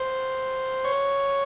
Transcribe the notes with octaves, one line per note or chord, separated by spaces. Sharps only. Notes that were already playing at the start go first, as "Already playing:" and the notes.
Already playing: C5
C#5